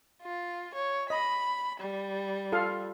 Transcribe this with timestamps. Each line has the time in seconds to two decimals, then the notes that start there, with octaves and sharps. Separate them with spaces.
0.22 F4
0.75 C#5
1.10 D#5 B5
1.81 G3
2.52 F4 A4 F5